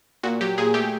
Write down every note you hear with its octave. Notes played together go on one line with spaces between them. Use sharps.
A#2 F#4
F#3 G4
A#2 G#4
A3 G4